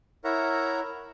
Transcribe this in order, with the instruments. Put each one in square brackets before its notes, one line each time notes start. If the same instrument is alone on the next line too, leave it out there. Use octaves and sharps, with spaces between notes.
[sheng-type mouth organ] E4 A#4 C#5 E5 F#5 A#5